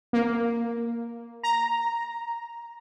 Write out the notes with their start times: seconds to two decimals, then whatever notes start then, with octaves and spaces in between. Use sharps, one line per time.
0.13 A#3
1.43 A#5